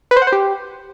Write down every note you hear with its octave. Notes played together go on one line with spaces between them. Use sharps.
B4
C5
F#5
C5
G4